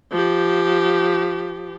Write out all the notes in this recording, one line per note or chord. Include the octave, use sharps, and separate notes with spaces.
F3 G4